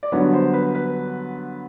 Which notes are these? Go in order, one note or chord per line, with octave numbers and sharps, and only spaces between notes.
D5
G2 D3 F#3 B3 C#5
C5
B4
B4